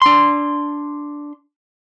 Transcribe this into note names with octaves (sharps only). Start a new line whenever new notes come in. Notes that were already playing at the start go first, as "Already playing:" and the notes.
D4 C6